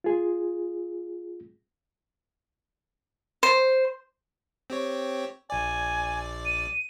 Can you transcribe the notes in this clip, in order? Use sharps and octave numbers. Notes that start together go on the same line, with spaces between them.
F4 G#4
C5
C4 G4 C#5
A#1 D5 G#5
D#7